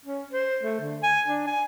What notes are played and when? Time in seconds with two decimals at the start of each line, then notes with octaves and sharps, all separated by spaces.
0.05 C#4
0.33 C5
0.63 A3
0.80 D3
1.03 G#5
1.28 D4
1.47 G#5